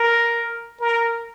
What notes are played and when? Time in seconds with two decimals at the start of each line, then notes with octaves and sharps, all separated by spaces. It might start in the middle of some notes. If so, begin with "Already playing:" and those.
Already playing: A#4
0.80 A#4